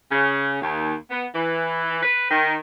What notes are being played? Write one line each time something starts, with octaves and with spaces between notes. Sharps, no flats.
C#3
D#2
B3
E3
B4
D#3